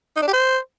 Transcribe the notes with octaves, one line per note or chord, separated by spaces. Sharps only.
D#4
D4
G4
C5